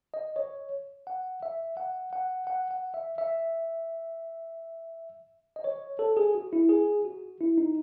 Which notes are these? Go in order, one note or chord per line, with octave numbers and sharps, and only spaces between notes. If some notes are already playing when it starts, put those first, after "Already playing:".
D#5
C#5
F#5
E5
F#5
F#5
F#5
F#5
E5
E5
D#5
C#5
A4
G#4
F#4
E4
G#4
F#4
E4
D#4